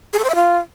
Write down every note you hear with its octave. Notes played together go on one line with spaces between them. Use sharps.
G#4
A4
C5
E5
F4